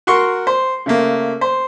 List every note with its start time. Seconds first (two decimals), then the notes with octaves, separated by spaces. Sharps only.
0.07 F#4 A#4 C6 C#6
0.47 C5
0.86 C#3 A3 A#3
1.41 C5